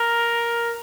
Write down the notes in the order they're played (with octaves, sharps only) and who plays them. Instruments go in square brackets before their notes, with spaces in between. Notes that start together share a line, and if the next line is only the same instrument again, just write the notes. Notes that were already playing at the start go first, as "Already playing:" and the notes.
Already playing: [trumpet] A#4